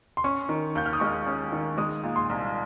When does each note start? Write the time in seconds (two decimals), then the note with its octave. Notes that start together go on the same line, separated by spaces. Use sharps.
0.17 C6
0.24 C#4 C#6
0.49 D#3
0.75 D#2 G6
0.86 F6
0.93 D#6
1.00 G#3 C#6
1.26 C#4
1.52 D#3
1.78 G#3 D#6
2.03 A#2
2.16 C6
2.29 C2